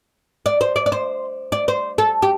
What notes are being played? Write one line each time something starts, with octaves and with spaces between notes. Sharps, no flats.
D5
C5
D5
D5
C5
D5
C5
A4
G4